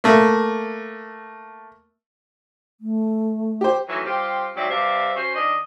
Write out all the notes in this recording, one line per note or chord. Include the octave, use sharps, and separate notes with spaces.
A3 A#3
A3
G4 C5
D#3 E3 F#3 A3
G3 C4 F4 G4
G#2 F#3 C4 D5 E5
G2 C3 D5 E5 F5
C#4 F#4 C5
D#3 D4 D#5